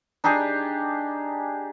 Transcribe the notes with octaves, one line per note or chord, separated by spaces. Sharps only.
D4 D#4 G4 G#4